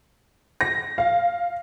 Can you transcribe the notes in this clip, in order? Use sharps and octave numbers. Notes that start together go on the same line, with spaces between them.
A#6
F5